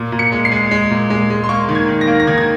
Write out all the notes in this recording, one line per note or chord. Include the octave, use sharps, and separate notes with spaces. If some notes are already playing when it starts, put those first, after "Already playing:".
Already playing: A#2
A#2
C#7
G#3
C7
G#3
G#3
A#2
G#3
G#3
C6
A#3 C#6
D#3
G#6
D#3
A#6
A#3
A#6
D#3 G#6
G#6